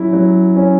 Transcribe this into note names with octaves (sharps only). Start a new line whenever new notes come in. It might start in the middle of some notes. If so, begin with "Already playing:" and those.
Already playing: F#3 C#4 E4
F#3
C#4